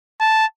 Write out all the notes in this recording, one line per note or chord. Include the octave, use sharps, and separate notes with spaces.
A5